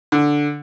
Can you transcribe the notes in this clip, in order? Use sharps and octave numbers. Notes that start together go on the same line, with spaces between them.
D3